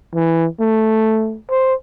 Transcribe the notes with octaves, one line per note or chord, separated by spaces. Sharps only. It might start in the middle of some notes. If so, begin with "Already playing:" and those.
E3
A3
C5